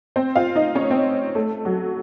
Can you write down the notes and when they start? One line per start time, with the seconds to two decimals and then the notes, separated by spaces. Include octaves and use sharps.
0.16 C4 C5
0.35 F4 F5
0.55 D#4 D#5
0.75 C#4 C#5
0.90 C4 C5
1.35 A3 A4
1.65 F#3 F#4